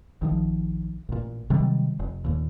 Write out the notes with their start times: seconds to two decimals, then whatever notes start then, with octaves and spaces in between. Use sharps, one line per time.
0.21 A#1 D#3 F3
1.09 A1 A#2
1.50 C3 D#3 F#3 G3
1.99 F1
2.25 D#2 A#2